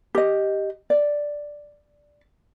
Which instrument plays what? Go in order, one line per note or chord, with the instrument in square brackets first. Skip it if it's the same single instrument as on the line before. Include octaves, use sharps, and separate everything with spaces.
[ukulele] G4 D#5
D5